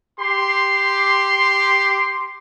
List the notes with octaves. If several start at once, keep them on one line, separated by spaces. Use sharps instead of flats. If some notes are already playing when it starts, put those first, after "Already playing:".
G4 C6